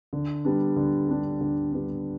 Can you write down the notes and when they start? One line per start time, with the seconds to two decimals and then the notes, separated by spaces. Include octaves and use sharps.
0.13 D3
0.45 G3 B3 D4
0.76 D3
1.08 G3 B3 D4
1.41 D3
1.72 G3 B3 D4